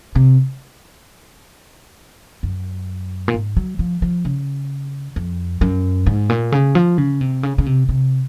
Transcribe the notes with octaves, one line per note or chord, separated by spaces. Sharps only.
C3
F#2
A#2
G#2
F#3
F3
F3
C#3
F2
F#2
G#2
A#2
C#3
F3
C#3
C3
C#3
C#3
C3
C3